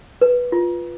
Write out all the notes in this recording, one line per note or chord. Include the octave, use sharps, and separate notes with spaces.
B4
F4